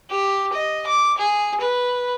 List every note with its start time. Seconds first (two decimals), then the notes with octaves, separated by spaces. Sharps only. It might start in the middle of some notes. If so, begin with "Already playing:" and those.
0.10 G4
0.53 D#5
0.87 D6
1.18 G#4
1.60 B4